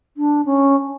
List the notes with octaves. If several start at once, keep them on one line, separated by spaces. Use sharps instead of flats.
D4
C#4